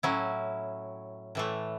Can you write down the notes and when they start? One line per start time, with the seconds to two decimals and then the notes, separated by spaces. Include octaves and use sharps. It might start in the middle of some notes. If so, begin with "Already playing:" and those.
0.03 A2 F#3 C#4 E4
1.35 A2 E3 A3